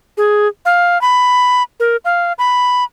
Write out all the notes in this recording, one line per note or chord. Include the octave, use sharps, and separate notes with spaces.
G#4
F5
B5
A#4
F5
B5